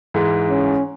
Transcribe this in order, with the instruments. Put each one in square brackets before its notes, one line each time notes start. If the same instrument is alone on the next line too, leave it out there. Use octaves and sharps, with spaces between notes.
[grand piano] G#2 E3 G#3
[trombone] C#4